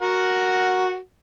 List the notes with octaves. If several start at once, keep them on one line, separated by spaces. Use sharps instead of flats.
F#4 A#4 F#5